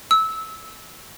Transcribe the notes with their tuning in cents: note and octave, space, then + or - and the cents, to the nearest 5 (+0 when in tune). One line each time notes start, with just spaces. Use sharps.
E6 -20